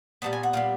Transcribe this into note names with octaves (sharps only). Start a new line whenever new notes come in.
A#2 G3 B3 A5
G#5
F#5
A#2 G3 B3 F5